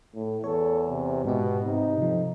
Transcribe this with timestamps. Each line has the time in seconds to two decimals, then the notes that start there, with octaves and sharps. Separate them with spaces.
0.14 A2
0.44 E2 A4 C#5
0.89 C3
1.25 G#2 B2 G4
1.65 C3 D#4
1.98 F2 C3 F3